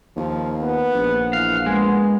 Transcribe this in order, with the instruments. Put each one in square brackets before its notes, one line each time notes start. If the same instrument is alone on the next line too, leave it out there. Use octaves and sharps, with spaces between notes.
[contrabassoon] D#2 [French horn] F3
[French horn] B3 [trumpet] F#5
[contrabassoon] A#1
[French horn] E3 [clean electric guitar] F5
[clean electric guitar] G#3 [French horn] B3